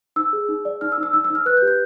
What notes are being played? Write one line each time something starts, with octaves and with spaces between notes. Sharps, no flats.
D#4 E6
G#4
D#4
D5
D#4 F6
E6
D#4
E6
D#4 E6
E6
D#4 F6
B4 F#6
G6
G4
G6